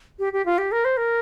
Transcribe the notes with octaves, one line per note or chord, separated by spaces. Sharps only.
G4
G4
F4
G4
A#4
C5
A#4